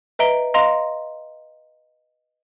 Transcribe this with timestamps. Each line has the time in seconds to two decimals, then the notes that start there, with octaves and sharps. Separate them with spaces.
0.19 B4 D#5 E5 A#5 D7 G7
0.54 D#5 F5 A#5 C6 A#6 F7